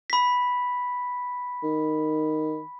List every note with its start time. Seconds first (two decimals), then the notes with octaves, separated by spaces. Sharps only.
0.10 B5 B6
1.63 D#3